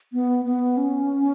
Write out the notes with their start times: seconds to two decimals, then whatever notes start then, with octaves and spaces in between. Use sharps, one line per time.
0.13 B3
0.45 B3
0.77 C#4